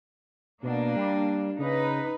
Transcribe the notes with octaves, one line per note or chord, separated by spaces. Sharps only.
B2 A#3 D4
G3
C#3 D#4 B4